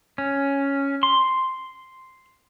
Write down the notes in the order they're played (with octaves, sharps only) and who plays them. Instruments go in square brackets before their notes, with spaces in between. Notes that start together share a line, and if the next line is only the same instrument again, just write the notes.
[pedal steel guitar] C#4
C6